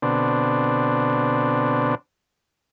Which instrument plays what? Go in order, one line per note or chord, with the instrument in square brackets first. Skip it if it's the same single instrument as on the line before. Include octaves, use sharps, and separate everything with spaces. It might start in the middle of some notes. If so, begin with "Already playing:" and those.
[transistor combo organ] B2 D3 C4 D4